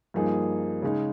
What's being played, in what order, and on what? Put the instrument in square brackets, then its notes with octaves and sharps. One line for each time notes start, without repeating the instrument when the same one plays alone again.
[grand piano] G2 F3 A#3 D#4 G#4
C#3 G#3 D#4